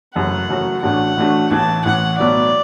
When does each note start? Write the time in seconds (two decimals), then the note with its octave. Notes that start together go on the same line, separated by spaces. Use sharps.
0.15 F#1 F#2 F#3 A3 F#4 F#5
0.49 F#1 F#2 F#3 A3 F#4
0.83 A1 A2 A3 D4 F#4 F#5
1.17 A1 A2 A3 D4 F#4
1.51 A1 A2 E3 A5
1.85 A1 A2 E3 F#5
2.19 B1 A2 F#3 B3 D5